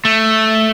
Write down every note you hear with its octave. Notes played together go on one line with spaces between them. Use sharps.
A3